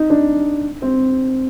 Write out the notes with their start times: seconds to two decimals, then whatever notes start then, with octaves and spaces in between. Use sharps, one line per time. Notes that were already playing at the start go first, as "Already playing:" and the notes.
Already playing: D#4
0.10 D4
0.82 C4